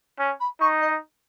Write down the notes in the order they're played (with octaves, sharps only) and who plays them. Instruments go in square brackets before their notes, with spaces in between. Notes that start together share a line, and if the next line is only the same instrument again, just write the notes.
[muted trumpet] C#4
[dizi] B5
[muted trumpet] D#4 [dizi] C#6
[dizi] D#5